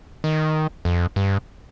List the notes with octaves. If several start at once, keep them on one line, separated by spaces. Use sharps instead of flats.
D#3
F2
G2